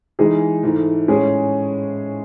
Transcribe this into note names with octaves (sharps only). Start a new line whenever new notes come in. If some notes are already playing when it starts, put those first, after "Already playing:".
E3 G#3 D#4 G#4
G#2 E3 A3
A2 G#3 C#4 G#4